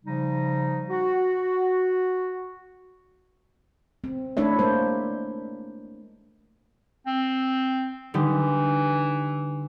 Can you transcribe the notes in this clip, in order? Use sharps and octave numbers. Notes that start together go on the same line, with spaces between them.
C#3 F3 G3 D#4
F#4
C4
A3 D4 E4 C#5 E5
G#3 A#3 C5
C4
D3 E3 G3 D#4